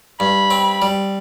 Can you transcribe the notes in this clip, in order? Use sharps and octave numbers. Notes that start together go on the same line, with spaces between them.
G2 B5
C4
G3